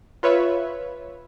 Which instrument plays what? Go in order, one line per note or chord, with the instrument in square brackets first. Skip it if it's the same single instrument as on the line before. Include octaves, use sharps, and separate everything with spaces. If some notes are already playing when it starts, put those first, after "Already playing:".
[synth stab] F4 B4 C#5 E5